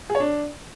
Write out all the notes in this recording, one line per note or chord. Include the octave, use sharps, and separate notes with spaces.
G#4
C#5
D4